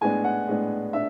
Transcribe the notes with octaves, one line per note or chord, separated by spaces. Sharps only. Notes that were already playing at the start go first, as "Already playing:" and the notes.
A2 G#3 B3 D4 G#5
F#5
A2 G#3 B3 D4
D4 E5